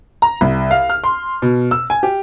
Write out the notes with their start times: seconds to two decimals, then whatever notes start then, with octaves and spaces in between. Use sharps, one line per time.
0.22 A#5
0.41 C2
0.71 F5
0.89 F6
1.04 C6
1.42 B2
1.71 E6
1.90 G#5
2.03 G4